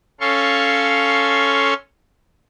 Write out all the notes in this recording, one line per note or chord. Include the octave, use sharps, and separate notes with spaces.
C#4 A4 F5 C6 C#6